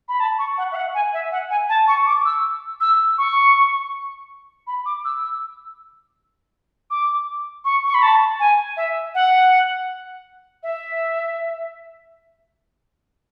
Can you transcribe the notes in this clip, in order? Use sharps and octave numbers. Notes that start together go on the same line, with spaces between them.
B5
A5
C#6
F#5
E5
F#5
G#5
E5
F#5
G#5
A5
C#6
D6
E6
E6
C#6
B5
D6
E6
E6
D6
C#6
C#6
B5
A5
G#5
E5
F#5
E5